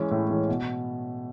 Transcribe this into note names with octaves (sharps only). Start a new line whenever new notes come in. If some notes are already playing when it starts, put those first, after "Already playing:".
Already playing: E3 G#3 C#4
A2
E3 G#3 C#4
B2